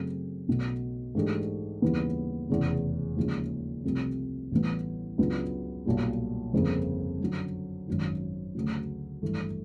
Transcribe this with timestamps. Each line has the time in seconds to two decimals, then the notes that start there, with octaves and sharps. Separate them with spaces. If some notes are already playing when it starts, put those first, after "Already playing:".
Already playing: F#2 C#3 F#3 A3 C4
0.48 B1 B2 F#3 A3
1.15 G#2 E3 A3 D4 G4
1.82 D#2 C#3 E3 G3 B3
2.49 F1 E2 C#3
3.17 D#2 C#3 F3 G#3
3.84 C2 C3 F3 A3 C4
4.51 A1 A2 E3 G3 B3
5.18 C#2 C#3 F#3 B3 D4
5.86 B1 A#2 G3
6.53 G1 F2 C#3 F3 A#3
7.21 F#2 D3 F#3
7.88 G#1 F#2 D#3
8.55 D2 C#3 F#3
9.22 G#1 G2 E3 A3